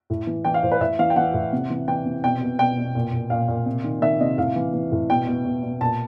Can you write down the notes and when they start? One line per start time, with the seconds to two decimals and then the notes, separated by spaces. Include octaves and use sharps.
0.10 A2
0.27 E3
0.45 E3 G5
0.54 F5
0.63 A2 C5
0.72 B4
0.80 A2 E5
0.99 E3 F5
1.10 G5
1.16 E3 F#5
1.34 A2
1.53 C3
1.70 E3
1.88 E3 G5
2.06 C3
2.24 B2 G5
2.41 B2
2.59 B2 G5
2.78 B2
2.95 A#2
3.12 A#2
3.30 A#2 F5
3.48 A#2
3.66 C3
3.84 D#3
4.01 D#3 E5
4.20 C3 D#5
4.38 A2 F5
4.56 E3
4.73 E3
4.92 A2
5.10 B2 G5
5.27 B2
5.45 B2
5.63 B2
5.81 A#2 A5